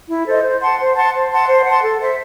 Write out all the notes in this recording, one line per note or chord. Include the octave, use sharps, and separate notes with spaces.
E4
A4 C5 D#5
C5
F#5 A5 C6
C5
F#5 A5 C6
C5
F#5 A5 C6
C5
F#5 A5 C6
A4
C5 E5